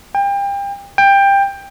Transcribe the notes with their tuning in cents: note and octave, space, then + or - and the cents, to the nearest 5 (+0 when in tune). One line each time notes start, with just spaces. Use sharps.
G5 +30
G5 +15